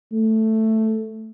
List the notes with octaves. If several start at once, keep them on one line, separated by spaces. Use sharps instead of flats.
A3